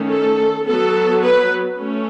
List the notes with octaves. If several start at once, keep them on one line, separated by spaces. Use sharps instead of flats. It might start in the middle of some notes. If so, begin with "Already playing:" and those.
Already playing: D#3 A3 C#4
A4
F#3 B3 A4
B4
A3 C#4